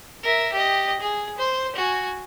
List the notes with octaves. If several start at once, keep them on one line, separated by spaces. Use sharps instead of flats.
A#4 E5
G4 D#5
G#4
C5
F#4 G#5